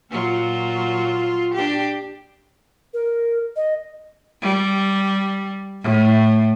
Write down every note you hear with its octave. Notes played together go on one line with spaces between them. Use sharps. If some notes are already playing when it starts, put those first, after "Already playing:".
A#2 F#3 F4
D4 G4
A#4
D#5
G3
A2